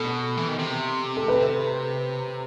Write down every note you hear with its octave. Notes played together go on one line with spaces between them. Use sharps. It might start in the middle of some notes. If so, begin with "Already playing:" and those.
Already playing: B2 A4
E3
D#3
C3
A4
B4